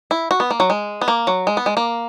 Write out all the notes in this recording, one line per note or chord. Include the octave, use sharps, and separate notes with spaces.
E4
F#4
B3
A#3
F#3
G#3
B3
A#3
F#3
G#3
B3
G#3
A#3